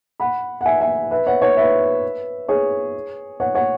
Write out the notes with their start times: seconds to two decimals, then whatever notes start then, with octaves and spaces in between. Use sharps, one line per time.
0.20 F#5 B5
0.61 F#5
0.66 E5 G#5
0.81 E5 G#5
1.11 B4 E5
1.26 C#5 F#5
1.42 C#5 F#5
1.57 B4 E5
2.49 G#4 C#5
3.40 C#5 F#5
3.55 C#5 F#5